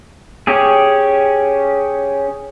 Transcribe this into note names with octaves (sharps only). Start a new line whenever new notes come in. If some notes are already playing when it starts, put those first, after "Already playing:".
C#4 G4 G#4